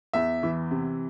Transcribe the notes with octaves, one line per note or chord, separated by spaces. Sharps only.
E2 E5
E3
C3